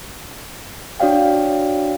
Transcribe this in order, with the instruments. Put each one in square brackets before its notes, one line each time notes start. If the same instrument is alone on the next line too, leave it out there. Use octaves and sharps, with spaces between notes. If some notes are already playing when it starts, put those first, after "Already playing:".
[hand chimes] D4 F#4 C#5 D5 F5 G5